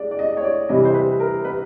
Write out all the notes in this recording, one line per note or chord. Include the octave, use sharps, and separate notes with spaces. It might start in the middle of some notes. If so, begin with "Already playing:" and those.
Already playing: G#3 D5
D5
D#5
C#5
D5
C3 E3 G3 D#5
C5
B4
A#4
B4